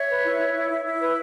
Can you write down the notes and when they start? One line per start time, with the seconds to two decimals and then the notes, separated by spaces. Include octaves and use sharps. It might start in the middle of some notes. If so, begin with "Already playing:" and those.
Already playing: C#5 E5
0.08 B4
0.24 E4
0.39 E4
0.55 E4
0.70 E4
0.85 E4
1.01 B4